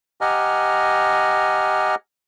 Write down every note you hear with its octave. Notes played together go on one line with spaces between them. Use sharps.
G4 D#5 F#5 G#5 A#5 F6